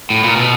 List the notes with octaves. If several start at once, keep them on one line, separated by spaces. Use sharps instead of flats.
A2
A#2
B2